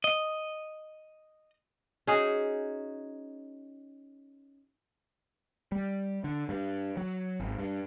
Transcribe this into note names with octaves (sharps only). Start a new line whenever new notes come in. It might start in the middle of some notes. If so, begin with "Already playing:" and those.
D#5
C#4 D#4 F#4 G#4
G3
D3
G2
F#3
G#1
G2